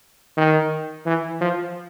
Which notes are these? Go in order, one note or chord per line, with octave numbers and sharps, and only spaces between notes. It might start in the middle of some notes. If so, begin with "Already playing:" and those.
D#3
E3
F3